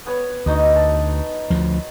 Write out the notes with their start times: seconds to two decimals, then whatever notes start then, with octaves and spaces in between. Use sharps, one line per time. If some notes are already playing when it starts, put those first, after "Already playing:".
0.06 B3 B4 C#5
0.46 D2 D#4 F#4 D#5
0.76 A5
1.50 D2 F3